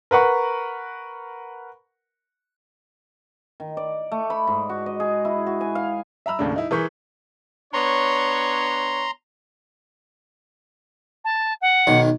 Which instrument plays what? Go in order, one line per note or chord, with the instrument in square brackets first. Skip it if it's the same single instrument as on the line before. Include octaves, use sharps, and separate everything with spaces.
[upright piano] A#4 B4 F#5 C#6
[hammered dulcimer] D#3
D5
A3
B5
G#2
F#4
D#5
G#4
E4
F#4
G#5
F5
[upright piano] E5 A#5 B5 E6
D#2 A2 C#3 D4
D#4 E4
E3 G#4 A#4 C#6 G6 B6
[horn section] B3 D4 C#5 [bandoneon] A#5 C6
[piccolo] A5
F#5
[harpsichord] B1 D#3